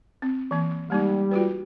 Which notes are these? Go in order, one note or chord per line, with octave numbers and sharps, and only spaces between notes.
C4
E3 A#3
G3 G#3 A#3 D#4
F4 F#4 B4